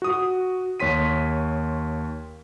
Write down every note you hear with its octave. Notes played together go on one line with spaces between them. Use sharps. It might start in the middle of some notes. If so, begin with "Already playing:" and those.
F#4 D#6
D#2 C#5 C6 B6 D#7